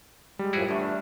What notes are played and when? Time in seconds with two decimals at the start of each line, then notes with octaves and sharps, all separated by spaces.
0.39 G3 G#3
0.53 F#2 A2 F3 E4 F#4 G#4
0.69 G1 E2 A2 A3 D4